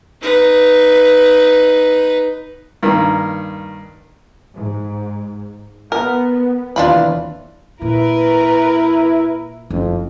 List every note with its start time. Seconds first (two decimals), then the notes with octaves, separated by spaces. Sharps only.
0.22 D#4 B4
2.83 G2 D#3 A#3
4.54 G#2
5.92 B3 A#4
6.76 D#2 C3 E3 D4 F4 B5
7.82 A#2 E4 A#4 B4
9.70 F#1 F2